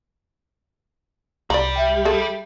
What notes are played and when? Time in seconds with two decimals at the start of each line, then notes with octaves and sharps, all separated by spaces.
1.50 C2 G3 D5 A#5
1.76 E5 G5
2.05 G#4 A4